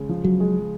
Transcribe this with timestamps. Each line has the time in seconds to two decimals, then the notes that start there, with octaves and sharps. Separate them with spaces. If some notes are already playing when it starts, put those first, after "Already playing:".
Already playing: C#3 G#3
0.09 F3
0.24 F#3
0.40 G#3